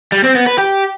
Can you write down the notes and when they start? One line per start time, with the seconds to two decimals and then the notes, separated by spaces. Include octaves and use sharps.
0.12 G3
0.24 C4
0.35 B3
0.47 B4
0.58 G4